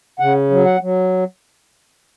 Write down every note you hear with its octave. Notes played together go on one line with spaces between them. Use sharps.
C#3 F#5
F#3
F#5
F#3